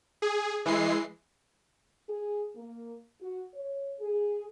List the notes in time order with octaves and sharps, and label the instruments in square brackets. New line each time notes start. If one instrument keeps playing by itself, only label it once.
[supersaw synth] G#4
E3 G#3 C7
[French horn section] G#4
A#3
F#4
C#5
G#4